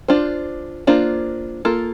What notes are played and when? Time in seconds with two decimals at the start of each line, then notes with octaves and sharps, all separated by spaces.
0.08 D4 F4 C5
0.87 A#3 D4 F4 C5
1.65 A#3 F4 A4